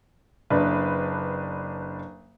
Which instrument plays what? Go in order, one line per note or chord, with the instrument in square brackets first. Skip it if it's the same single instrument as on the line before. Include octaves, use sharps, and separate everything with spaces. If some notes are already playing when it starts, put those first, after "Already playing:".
[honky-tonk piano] F#1 D4 B4